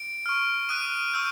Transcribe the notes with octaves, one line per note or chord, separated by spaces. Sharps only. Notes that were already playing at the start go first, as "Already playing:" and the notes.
Already playing: D7
C#6 F6
D#6 F#6 D#7
C#6 E6 G6